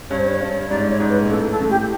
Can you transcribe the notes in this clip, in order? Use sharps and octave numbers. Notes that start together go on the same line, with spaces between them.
G2 C#5
C5
C#5
G2
G#2 D5
C#5
G#2
B4
A#2
A2 A4
A4
A2
G4